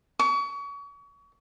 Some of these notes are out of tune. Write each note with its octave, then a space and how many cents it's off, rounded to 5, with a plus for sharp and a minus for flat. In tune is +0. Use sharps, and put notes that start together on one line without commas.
C#6 +35